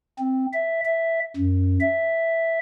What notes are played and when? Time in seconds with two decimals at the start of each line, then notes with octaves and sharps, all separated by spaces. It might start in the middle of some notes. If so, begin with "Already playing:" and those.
0.19 C4
0.53 E5
0.85 E5
1.37 F#2
1.81 E5